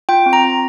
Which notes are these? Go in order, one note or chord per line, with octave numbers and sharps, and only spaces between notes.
F4 G5
C4
A#5
C4